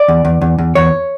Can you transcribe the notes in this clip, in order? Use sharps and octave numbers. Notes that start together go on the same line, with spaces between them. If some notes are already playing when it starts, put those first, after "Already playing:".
Already playing: D5
E2
E2
E2
E2
E2 C#5